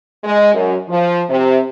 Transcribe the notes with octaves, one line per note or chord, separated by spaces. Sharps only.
G#3
F#2
F3
C3